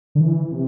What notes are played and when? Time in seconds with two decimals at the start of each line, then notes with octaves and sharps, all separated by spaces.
0.15 D3
0.20 E3
0.51 C3